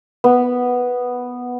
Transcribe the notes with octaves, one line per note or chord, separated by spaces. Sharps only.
B3